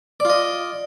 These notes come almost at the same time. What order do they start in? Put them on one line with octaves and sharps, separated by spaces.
D5 F4 D#5